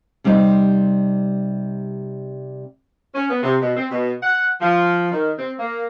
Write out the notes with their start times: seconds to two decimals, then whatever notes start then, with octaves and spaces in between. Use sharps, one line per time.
0.24 C3 G3 C4 D#4 G4
3.15 C#4
3.30 B3
3.43 C3
3.62 B2
3.76 C4
3.91 B2
4.23 F#5
4.61 F3
5.12 D#3
5.39 C4
5.59 A#3